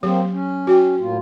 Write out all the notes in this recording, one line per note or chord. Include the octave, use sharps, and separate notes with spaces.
F#3 A#3 C4 G4 C#5
C#4
F#4 C#5 G5
A2 A#3 F4